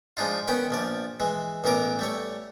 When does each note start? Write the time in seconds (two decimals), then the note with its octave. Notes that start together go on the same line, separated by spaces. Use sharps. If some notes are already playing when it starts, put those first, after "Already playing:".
0.17 F3 G#3 D4 D#4 F4
0.48 D#3 B3 C#4 G5 B5
0.70 A#1 F3 D5
1.20 E3 G#3
1.64 A1 E3 B3 A#4 D6
1.99 G3 A3 C#5